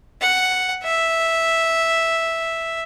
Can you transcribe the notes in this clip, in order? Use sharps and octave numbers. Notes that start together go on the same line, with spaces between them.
F#5
E5